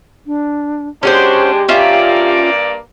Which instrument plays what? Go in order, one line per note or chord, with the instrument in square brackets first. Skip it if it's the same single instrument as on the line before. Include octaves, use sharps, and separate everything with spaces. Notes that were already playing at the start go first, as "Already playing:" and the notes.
[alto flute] D4
[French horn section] G#3 D4 [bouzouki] C#4 F#4 C5 [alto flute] G4
[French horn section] G2 A#3 D5 [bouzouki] C#4 F4 E5